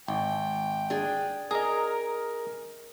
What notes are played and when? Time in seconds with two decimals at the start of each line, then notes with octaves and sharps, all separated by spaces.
0.08 G#1 G5
0.90 D4 G#4
1.51 G#4 A#4 D#5 A#5